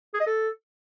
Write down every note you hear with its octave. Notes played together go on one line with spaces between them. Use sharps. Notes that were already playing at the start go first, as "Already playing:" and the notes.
G#4
D#5
A4